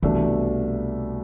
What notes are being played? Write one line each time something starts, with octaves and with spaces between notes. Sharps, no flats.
C2 B2 E3 A3 D4